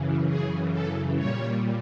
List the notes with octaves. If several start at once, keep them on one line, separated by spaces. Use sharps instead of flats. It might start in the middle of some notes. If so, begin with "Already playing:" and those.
Already playing: F#2 C#3 E3
G#4
A4
A#2 G3 C#5